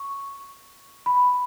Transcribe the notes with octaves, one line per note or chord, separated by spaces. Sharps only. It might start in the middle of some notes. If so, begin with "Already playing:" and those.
Already playing: C#6
B5